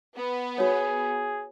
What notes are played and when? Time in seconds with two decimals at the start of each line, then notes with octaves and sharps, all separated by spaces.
0.16 B3
0.58 F#4 G#4 C#5